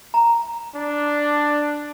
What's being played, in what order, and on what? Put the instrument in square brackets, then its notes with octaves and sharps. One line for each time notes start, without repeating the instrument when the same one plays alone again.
[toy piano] A#5
[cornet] D4